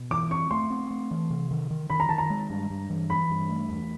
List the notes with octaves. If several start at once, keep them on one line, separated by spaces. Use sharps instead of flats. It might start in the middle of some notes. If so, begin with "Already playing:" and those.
Already playing: B2
E3 D6
C4 C#6
A3 C6
C4
A3
E3
C3
D#3
D#3
D#3 B5
A#5
D#3 A5
A#5
G#3
G2
G2
E3
E3 B5
G2
A3
E2